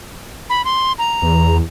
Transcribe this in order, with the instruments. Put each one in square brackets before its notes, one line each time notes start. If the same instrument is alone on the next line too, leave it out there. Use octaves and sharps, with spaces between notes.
[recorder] B5
C6
A#5
[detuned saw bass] E2